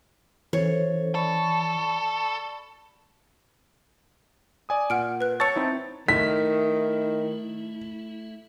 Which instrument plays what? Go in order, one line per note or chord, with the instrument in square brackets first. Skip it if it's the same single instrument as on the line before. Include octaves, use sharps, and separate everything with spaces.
[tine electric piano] E3 [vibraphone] C#4 A4 C5 [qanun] C#5
[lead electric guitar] A4 [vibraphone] D5 B5 C#6
[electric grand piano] D5 G#5 D#6
[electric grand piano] A#2 [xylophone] F#5 F6 D7
[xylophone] B4 F#6
[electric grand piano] C#5 A5 A6 [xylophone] C#6 E6 C#7
[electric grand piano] C4 D#4 E4
[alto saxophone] D#3 [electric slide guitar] A3 E4 [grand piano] B6